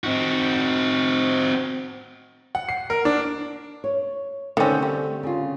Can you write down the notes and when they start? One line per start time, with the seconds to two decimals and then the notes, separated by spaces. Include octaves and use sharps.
0.04 C4 F#4
2.55 F#5
2.69 C7
2.90 A#4
3.05 D4
3.84 C#5
4.57 D3 D#3 A3 C4 C#4
4.82 G3
5.23 C#3 F4